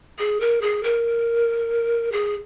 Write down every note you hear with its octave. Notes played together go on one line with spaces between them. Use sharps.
G#4
A#4
G#4
A#4
G#4